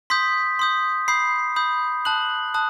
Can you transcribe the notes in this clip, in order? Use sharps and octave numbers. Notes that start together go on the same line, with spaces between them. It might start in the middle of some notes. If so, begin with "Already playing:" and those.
C6 D#6 G6 B6
C6 D#6 G6
B5 D#6 G6 C7
B5 D#6 G6
A5 D#6 F#6 F#7
A5 D#6 F#6